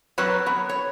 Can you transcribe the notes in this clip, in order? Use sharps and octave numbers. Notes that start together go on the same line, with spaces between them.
F#3 C4 F#4 A#4 B4 C#5
B3 C#5
C#5